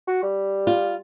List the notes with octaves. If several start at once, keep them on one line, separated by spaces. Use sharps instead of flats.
F#4
G3
F4